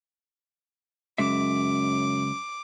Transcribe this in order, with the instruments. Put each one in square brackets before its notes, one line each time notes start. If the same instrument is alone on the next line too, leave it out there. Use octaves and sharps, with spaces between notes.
[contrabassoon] F#2 [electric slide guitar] C#3 G#3 E5 [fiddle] D6